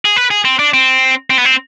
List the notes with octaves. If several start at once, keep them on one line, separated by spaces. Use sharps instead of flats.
G#4
B4
G#4
C4
D4
C4
C4
B3
C4